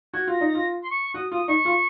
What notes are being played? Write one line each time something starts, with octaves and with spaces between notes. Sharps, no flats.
F#4 G#6
F4 A#6
D#4
A#6
F4
C6
C#6
F#4 D#6
F4 D#6
D#4 C#6
F4